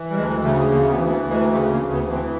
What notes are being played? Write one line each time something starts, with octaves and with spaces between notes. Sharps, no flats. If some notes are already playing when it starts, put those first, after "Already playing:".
Already playing: E3
G3
D2 G#3
C#3 A3
D2 A#3
B3
E3
B3
D2
G#3
C#3 A3
A#3
D2
B3
E3
C4